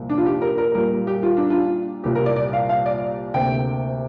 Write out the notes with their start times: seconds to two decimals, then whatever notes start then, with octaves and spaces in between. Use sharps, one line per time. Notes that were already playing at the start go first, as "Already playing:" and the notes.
Already playing: C2 A#2 F3 A#3
0.10 D4
0.18 F4
0.26 G4
0.42 A#4
0.58 A#4
0.74 A#2 G3 A#3 A#4
1.07 G4
1.23 F4
1.37 D4
1.50 F4
2.04 C2 A#2 G3 A#3 G4
2.15 A#4
2.26 D5
2.36 D5
2.53 F5
2.69 F5
2.86 D5
3.34 D2 C3 A#3 G5